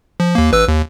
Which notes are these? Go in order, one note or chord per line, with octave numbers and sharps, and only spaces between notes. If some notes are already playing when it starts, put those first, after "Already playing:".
F3
D#2 A#3
A1 B4 E6
D#2